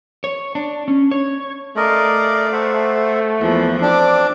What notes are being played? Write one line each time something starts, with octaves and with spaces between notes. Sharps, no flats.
C#5
D4
C#4
C#5
A3 A#4 D5 D#5 F5
C5 E5 F#5
E2 E3 F3 A#3
C4 D4 D6